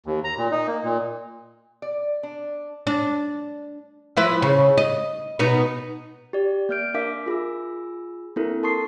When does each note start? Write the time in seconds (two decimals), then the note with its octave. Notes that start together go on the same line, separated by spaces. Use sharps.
0.06 D#2
0.24 A#5
0.38 A#2
0.51 D#4
0.67 A#3
0.84 A#2
1.82 D5
2.23 D4
2.87 D4
4.17 F3 E4 B4
4.42 C#3
4.77 D#5
5.39 B2 B3 D#4
6.33 G4 D5
6.69 A#3 D5 F6 G6 D7
6.94 D4 A#4 E5 F5 D6 B6
7.26 F4 G#4 B5 E6
8.36 A#3 C4 D4 E4 A4 A#4
8.63 A#4 A5 C6 C#6 D#6 C7